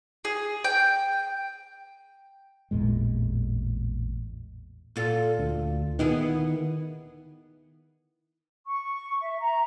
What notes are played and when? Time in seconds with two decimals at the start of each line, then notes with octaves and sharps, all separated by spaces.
0.25 G#4
0.64 G5
2.71 A1 E2 A#2 G#3
4.96 A#2 F4 A4
5.39 D2
5.99 D#3 B3 E4 G#4
8.66 C#6
9.20 E5
9.41 A#5